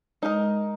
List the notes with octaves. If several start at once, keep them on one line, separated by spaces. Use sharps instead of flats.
G#3 D#4 A#4 D#5